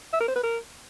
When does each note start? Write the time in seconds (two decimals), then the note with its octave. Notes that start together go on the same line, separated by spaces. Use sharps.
0.13 E5
0.20 A#4
0.28 C5
0.36 B4
0.43 A#4